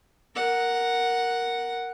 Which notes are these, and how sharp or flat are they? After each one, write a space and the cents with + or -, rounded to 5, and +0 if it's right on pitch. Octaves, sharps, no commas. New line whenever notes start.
A#4 +0 F#5 +0